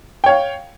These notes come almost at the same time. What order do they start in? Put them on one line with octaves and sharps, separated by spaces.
G5 C#5 F5